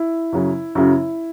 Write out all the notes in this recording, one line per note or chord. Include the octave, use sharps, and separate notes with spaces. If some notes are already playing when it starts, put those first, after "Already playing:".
Already playing: E4
F#2 C#3 F#3
F#2 C#3 F#3 E4